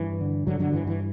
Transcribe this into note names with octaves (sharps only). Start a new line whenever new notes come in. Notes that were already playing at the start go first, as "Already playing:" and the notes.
Already playing: G2 E3
D3
G2 D3 F#3
D3 F#3
G2 E3
E3